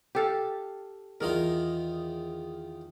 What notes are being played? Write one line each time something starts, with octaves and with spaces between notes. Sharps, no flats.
G4 A4 F5
E2 D#3 F4 A#4